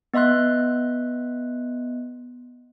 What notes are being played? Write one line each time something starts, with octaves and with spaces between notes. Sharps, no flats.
B3 D#5 E5 C6 F#6